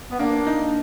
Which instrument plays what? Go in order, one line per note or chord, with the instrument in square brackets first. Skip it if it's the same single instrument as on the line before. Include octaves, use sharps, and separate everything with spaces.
[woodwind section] B3
[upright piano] A#3 [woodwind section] D4
[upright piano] D#4